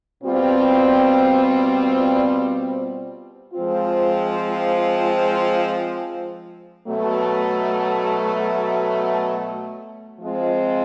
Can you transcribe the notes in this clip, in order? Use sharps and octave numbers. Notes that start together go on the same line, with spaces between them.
B2 G3 C4 F4
F3 G#3 C4 F4
B2 F#3 A3
F3 G#3 C4 F4